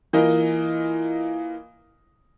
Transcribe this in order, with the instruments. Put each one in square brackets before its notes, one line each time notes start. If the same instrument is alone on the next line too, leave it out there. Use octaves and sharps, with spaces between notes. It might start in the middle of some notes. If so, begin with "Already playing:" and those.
[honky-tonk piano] E3 A#3 F4 A#4 D#5